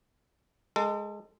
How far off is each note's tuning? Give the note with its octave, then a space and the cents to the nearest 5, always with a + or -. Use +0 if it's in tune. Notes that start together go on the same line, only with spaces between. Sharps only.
G#3 +0 A4 +35